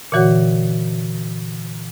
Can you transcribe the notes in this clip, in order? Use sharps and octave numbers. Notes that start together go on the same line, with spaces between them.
A#2 D3 E3 F#4 C#5 F#5